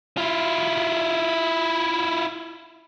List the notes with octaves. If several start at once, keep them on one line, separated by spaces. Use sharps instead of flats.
E4 F4